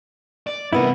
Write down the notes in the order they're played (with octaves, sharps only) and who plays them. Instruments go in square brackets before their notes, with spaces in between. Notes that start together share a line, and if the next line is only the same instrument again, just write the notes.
[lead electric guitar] D5
[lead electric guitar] G2 C3 [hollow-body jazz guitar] A#3 B3 E4